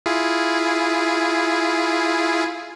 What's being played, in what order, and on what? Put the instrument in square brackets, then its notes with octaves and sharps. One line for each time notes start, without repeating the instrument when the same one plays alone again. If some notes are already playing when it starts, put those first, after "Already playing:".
[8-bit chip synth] E4 F4 G#4